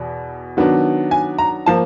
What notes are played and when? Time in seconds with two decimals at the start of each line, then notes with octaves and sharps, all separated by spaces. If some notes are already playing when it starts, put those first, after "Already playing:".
Already playing: E2 B2
0.57 D#3 F#3 B3 D4
1.11 G#5
1.38 A#5
1.66 F3 A#3 A5